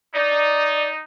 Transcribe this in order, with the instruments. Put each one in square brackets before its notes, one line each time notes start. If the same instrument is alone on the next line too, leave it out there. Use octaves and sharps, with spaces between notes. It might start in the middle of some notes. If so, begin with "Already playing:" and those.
[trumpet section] D#4 [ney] D5